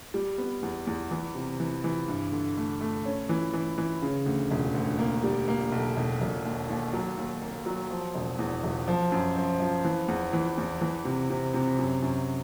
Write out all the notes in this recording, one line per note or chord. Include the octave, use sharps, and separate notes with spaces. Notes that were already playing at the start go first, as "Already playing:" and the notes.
G3
B3
E2
E2
E3
C3
E3
E3
G2
D3
A3
A3
C#4
E3
E3
E3
C#3
D2
E1
D2
A#3
G3
A#3
B1
E1
E1
D#2
D#2
F#3
D#2
A#3
F#3
F3
E1
E2
E1
F3
F#2
F3
F3
E3
E2
E3
E2
E3
C3
C3
C3
F#2
F#2